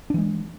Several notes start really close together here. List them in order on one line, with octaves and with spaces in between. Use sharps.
D4 E3 G#3